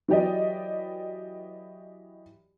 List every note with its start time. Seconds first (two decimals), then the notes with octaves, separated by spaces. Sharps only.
0.08 E3 F#3 G4 D5 D#5